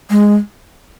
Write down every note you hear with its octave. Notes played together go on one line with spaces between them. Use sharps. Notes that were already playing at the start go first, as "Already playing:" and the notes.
G#3